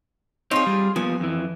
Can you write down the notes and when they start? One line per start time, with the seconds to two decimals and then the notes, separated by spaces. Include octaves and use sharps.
0.51 C4 D#4 F4 G#4 C#5
0.66 G3
0.96 F3 A#3 B3 G#5
1.20 F2 E3